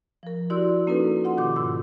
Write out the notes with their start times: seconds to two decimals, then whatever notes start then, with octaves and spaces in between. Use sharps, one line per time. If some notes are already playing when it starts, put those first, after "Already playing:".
0.23 F3 A#4
0.50 E4 F#4 G4 D5 C6 E6
0.87 A#3 C#4 D#4 F#4 A4 B4
1.24 F4 F#5 C6
1.37 B2 D#3 G4 D6
1.56 G#2 E6